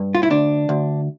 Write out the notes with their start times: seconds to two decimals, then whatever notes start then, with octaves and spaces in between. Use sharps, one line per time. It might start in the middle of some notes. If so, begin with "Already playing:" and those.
Already playing: G2
0.15 F4
0.23 E4
0.30 D2 D4
0.69 D2